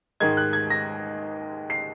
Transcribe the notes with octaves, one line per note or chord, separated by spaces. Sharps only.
G#2 D#3 G#3 G#6
F#6
G#6
A#6
C7